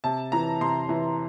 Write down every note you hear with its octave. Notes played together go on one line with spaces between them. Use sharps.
C3 A5
E3 A#5
C3 C6
E3